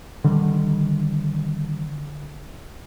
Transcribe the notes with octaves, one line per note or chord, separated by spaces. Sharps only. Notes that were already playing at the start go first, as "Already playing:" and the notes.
D3 D#3 G3